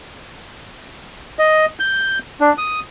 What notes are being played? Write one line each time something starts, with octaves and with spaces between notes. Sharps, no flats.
D#5
G6
D4
D#6